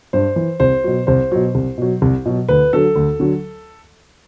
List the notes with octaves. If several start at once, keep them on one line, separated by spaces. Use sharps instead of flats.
G2 C5
E3
C2 C5
B2 F#3
C2 C5
B2 F#3
C2
B2 F#3
C2
B2 F#3
D2 B4
D3 F#3 A4
D2
D3 F#3